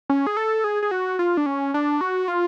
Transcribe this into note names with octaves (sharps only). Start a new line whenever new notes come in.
C#4
G#4
A4
G#4
G#4
F#4
F4
D4
C#4
D4
F#4
F4